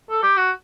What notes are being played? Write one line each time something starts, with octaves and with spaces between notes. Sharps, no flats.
A4
G4
F#4